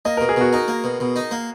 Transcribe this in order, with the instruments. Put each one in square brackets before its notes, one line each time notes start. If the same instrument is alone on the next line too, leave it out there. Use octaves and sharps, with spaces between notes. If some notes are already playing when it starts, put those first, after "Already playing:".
[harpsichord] A#3 [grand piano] D#5
[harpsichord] B2 [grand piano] A#4
[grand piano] G#4
[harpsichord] B2 [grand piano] F#4
[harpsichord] D#4 [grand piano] A#4
[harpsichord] A#3
B2
B2
D#4
A#3